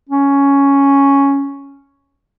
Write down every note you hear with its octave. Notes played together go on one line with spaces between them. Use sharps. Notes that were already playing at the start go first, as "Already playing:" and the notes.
C#4